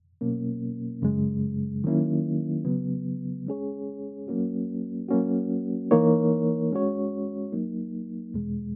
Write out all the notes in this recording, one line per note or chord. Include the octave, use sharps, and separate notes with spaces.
B2 F#3 A#3 C#4
F#2 C#3 G#3
D#3 F#3 A#3 C#4 E4
C#3 F#3 B3
G#3 C#4 G#4 C#5
F#3 A#3 C#4 F#4
F#3 A#3 C#4 F#4
E3 A#3 D#4 A#4 C#5
G#3 C#4 F#4 C#5
F#3 A#3 D#4
E2 B2 G#3